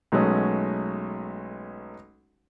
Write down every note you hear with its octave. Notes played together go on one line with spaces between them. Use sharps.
B1 F#3 G#3 A3 C#4